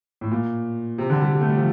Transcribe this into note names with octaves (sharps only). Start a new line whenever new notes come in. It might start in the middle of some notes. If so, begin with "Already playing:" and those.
A2
A#2
C3
D3
G3
G3
A3
G3
F3